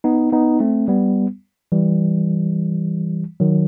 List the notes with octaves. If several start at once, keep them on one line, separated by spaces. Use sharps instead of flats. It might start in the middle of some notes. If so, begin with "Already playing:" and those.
B3 D#4
B3 D#4
A3 C4
G3 B3
E3 G3
D#3 F#3